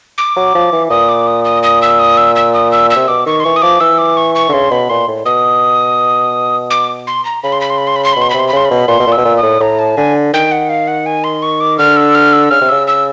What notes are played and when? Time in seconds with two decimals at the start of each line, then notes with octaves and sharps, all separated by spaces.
0.18 D6
0.36 F#3
0.55 F3
0.73 E3
0.90 A#2 D#6
1.09 D6
1.27 D#6
1.45 D#6
1.63 D#6
1.82 E6
1.99 D#6
2.17 E6
2.36 E6
2.54 D#6
2.72 E6
2.90 E6
2.96 C3
3.08 B2 D6
3.26 D#3 C#6
3.40 C6
3.44 E3 C#6
3.56 D#6
3.62 F3 D6
3.80 E3 E6
3.98 D6
4.17 C#6
4.35 C#6
4.49 D3
4.53 C#3 C6
4.71 B2 B5
4.90 A#2 C6
5.07 A2
5.25 B2 D#6
6.71 D6
7.07 C6
7.25 A#5
7.43 C#3 B5
7.52 C6
7.61 B5
7.70 C6
7.78 B5
7.87 C6
7.96 B5
8.04 C6
8.13 B2 B5
8.22 C6
8.30 C3 B5
8.39 C6
8.48 B5
8.53 C#3 C6
8.65 B5
8.71 B2
8.88 A#2 C6
9.00 B2
9.07 A#2
9.12 E6
9.18 B2
9.25 A#2
9.37 A2 D#6
9.60 A2 A#5
9.79 A5
9.97 D3 G#5
10.33 D#3 G5
10.52 F#5
10.69 F5
10.88 F#5
11.06 G#5
11.24 C6
11.42 C#6
11.60 D6
11.79 D3 F6
11.97 E6
12.15 F6
12.33 E6
12.51 C#3 F6
12.61 C3
12.69 C#3 E6
12.87 E6